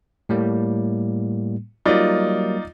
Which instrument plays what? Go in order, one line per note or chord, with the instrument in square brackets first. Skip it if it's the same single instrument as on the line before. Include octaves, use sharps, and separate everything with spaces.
[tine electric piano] A2 G3 A#3
[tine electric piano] F#3 G3 A#3 [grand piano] D#4 F4 D5